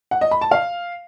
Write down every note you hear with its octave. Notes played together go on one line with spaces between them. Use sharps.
F#5
D#5
B5
A5
F5